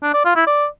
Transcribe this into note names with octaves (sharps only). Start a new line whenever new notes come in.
D4
D5
F4
E4
D5